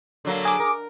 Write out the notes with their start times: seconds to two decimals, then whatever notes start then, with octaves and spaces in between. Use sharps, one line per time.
0.25 D3 F#3 A#3
0.45 G#4 D6
0.60 A#4